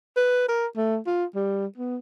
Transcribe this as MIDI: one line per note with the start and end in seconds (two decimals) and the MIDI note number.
0.16 0.46 71
0.48 0.67 70
0.77 0.98 57
1.07 1.25 65
1.35 1.66 55
1.78 1.98 59